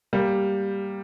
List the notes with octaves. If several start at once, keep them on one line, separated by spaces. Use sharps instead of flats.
G3 A#3